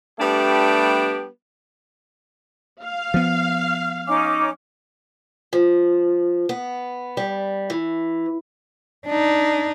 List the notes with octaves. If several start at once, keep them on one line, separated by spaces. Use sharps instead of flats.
G3 A3 B3 D4 G4
F5
F3 B3
C#4 D#4 D6
F3
B3
G3
E3
D4 D#4